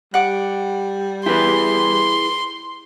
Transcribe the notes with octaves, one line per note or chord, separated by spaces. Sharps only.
G3 F#5 D6
E4 G#4 B4 G5 C6